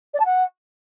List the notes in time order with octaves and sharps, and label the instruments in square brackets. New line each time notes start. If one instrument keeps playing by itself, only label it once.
[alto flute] D5
A5
F#5